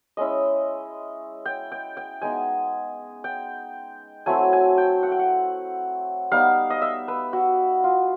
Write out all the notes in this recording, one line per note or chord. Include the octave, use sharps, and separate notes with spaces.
G#3 C#4 E4 D#5
G5
G5
G5
G#3 B3 D#4 G#5
G5
F#3 A3 C4 E4 G#5
G#5
G5
F#5
G5
F#5
G3 B3 D#4 F5
D#5
E5
B4
F#4
F4